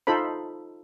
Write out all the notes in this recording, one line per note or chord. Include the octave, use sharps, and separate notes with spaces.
D#4 F4 A4 C5 B5